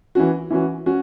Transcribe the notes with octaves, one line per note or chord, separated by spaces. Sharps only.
E3 C#4 F#4
E3 C#4 F#4
C#4 F#4